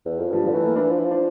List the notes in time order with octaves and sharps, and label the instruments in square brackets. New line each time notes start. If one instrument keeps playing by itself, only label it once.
[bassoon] E2
F2
[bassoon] G2 [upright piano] F3
[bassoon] D3 [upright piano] F3
[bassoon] E3 [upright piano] A3
[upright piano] A#3
[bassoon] E3 [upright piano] D4
[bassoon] F3
E3
F3
[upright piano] D4